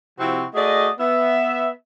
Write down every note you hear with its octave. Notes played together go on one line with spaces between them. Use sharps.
C3 F3 C4 E4 F#4
A3 F#4 G#4 D5 D#5
B3 E5